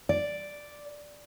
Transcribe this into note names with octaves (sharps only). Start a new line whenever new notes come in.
D5